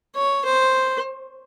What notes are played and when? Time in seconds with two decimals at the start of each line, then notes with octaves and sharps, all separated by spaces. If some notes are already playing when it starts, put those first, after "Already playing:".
0.16 C#5
0.45 C5